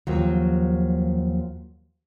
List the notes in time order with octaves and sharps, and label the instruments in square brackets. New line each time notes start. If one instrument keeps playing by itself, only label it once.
[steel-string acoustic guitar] D#2 F3 F#3